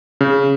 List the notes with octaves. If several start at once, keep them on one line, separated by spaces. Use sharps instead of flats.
C#3